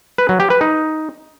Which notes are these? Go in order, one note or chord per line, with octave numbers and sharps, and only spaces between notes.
B4
F#3
G4
B4
D#4